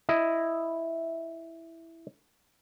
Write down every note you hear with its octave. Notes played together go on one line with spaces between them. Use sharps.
E4 D#5